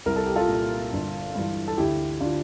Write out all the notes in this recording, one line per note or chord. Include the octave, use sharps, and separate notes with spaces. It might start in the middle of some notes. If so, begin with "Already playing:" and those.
C2 A#4
A4
G4
F4 A4
A#2
G1
G2 E3
A4
D2 E4 G4
D3 D4 F4